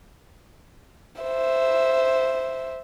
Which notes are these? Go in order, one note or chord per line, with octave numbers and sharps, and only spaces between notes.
C5 E5